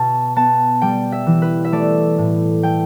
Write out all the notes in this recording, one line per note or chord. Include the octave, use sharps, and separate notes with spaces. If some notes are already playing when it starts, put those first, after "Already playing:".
Already playing: B2 A5
B3 A5
G3 G5
E5
E3
B4
E5
A3 D5
A2
A3 G5